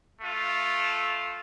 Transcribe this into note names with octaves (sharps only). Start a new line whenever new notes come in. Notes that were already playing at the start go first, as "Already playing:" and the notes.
A3 F4